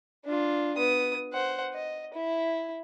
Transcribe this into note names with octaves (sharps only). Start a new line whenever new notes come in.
D4 F4
B3 D#6
C5 F#5
D#5
E4